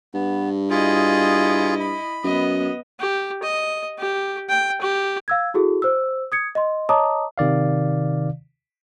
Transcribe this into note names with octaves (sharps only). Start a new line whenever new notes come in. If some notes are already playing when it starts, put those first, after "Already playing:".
G2 B3
E4 F4 G#4 D#5
B5
F#2 B3 D#5
G4
D#5
G4
G5
G4
F5 E6 G#6
E4 F#4 G#4 A4
C5 E6
D#6 G#6 C#7
D#5 C6
C#5 D#5 A5 A#5 D6 D#6
C3 D#3 D5 F5